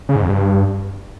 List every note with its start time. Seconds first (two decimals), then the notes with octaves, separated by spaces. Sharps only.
0.09 C#3
0.16 G#2
0.23 F2
0.29 G2